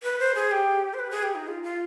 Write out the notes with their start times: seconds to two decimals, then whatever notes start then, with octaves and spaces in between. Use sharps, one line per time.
0.03 B4
0.19 C5
0.35 G#4
0.52 G4
0.94 C5
0.99 B4
1.11 G#4
1.23 G4
1.35 D#4
1.47 F4
1.63 F4